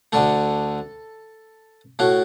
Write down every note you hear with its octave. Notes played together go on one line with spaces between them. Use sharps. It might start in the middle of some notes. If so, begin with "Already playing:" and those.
D2 D3 A3 A4
A2 A3 F#4